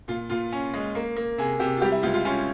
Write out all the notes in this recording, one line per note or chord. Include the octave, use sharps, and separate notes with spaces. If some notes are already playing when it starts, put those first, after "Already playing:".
A#2 F4
A#2 F4
C#4
G#3
A#3
A#3
C3 G#4
C3 G4
F4
G3 G4
E4
C#2 F4
F4
C#4 F4